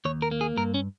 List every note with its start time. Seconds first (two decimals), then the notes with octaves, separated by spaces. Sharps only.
0.05 D#2 C#5
0.22 A#4
0.31 A#3
0.41 G#4
0.57 G2 A#4
0.74 C#4